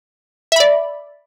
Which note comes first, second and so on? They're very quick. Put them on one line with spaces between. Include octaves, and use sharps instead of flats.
E5 B5 D5